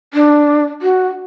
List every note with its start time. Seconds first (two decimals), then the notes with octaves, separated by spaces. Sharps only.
0.14 D4
0.82 F#4